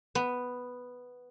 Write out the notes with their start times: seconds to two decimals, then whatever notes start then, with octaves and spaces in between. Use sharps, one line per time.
0.15 B3